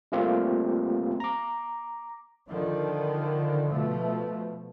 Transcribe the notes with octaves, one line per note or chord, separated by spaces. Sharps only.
G3 A3 A#3 C4 F4 G4
A#5 D6
D3 D#3 F3
B2 F3 A3